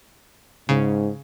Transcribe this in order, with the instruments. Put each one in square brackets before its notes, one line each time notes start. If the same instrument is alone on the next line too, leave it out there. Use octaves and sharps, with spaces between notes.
[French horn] G#2 [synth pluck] C#3